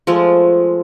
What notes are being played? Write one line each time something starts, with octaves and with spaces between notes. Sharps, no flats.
F3 G#3 A3